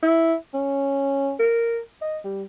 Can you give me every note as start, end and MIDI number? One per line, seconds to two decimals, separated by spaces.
0.03 0.34 64
0.54 1.33 61
1.39 1.79 70
2.02 2.18 75
2.24 2.43 55